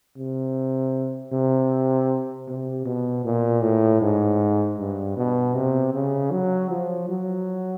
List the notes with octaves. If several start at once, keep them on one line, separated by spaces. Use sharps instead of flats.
C3
C3
C3
B2
A#2
A2
G#2
G2
B2
C3
C#3
F#3
F3
F#3